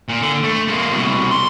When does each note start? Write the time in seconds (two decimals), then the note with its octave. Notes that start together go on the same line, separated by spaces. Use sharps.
0.09 A#2
0.22 D3
0.44 A3
0.68 G#3 A#3
0.91 C2 B2
1.31 C6